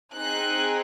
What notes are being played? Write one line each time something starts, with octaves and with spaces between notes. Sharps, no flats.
C4 D#4 G#4 F#6